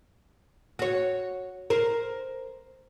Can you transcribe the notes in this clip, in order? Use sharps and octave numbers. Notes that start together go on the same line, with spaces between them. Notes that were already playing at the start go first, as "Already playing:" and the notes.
F#4 C#5
A#4 C5